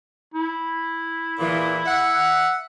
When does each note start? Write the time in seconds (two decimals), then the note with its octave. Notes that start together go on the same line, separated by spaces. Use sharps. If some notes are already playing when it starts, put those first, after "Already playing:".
0.34 E4
1.39 E2 A#2 E3
1.86 E5 F#5